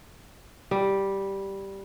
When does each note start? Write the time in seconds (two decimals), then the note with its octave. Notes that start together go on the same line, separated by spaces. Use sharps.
0.71 G3